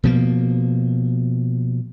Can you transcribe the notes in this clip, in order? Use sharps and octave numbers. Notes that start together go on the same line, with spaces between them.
B2 F3 A#3